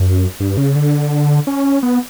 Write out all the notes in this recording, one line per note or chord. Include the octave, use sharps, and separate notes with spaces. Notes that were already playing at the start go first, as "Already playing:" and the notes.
Already playing: F#2
G2
C#3
D3
C#4
B3